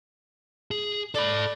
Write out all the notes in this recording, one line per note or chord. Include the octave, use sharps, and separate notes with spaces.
G#4
A4 D5 B5